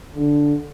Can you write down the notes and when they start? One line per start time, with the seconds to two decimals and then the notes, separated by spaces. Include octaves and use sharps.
0.15 D3